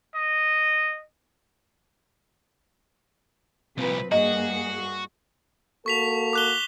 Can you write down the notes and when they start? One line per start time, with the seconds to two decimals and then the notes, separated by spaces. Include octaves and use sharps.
0.15 D#5
3.78 C2 A#2 F3 C4 B4
4.12 G2 A#3 F#4 G#4 D#5
5.86 A#3 F#4 A4 C#6 B6 F7
6.33 D6 F#6 G7